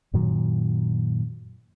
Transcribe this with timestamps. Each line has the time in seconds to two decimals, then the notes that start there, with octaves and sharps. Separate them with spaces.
0.14 F#2 A#2 D#3 F#3